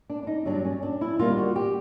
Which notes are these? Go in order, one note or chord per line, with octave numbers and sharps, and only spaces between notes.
D4
D4
D#4
G2 D3 F#3 D4
C#4
D4
E4
D#2 D3 G3 A#3 F4
F#4
G4